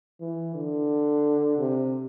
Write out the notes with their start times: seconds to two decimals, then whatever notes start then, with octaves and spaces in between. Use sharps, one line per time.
0.20 E3
0.55 D3
1.58 C3